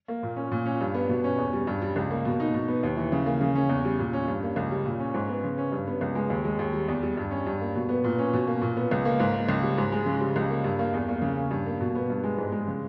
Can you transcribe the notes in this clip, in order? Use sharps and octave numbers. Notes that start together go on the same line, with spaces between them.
A#3
A#2
C#4
A#2
C#4
G2
B3
B2
C#4
E2
G3
G2
G3
C#2
A#3
B2
D#4
B2
B3
D#2
E3
C#3
A#3
C#3
C#4
E2
G3
A#2
C#4
G2
A#3
C#2
G3
A#2
C#4
G#2
B3
C#3
C#4
G2
B3
C#2
G#3
D#2
G#3
D#2
G3
E2
G3
G2
C#4
G2
A#3
B2
B3
A#2
C#4
B2
A#3
A#2
B3
C#2
A#3
G#2
A#3
C#2
G3
G#2
G#3
C#3
G3
C#2
A#3
G2
A#3
E2
A#3
C#3
C#4
G2
A#3
B2
B3
G2
G#3
G#2
G#3
C#3